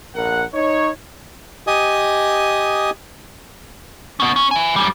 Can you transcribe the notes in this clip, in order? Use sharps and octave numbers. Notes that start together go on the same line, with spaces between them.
A#1 A#4 F#5
D#4 C#5
G4 D#5 G#5 D#6
B3 C#4
C#4
E5 G#5
F#2 G3